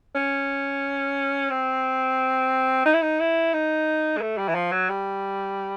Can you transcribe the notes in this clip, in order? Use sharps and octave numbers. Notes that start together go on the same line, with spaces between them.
C#4
C4
D#4
E4
D#4
E4
D#4
G#3
A3
G3
E3
F3
F#3
G3